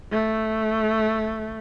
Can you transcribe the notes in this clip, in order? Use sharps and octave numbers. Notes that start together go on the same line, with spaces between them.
A3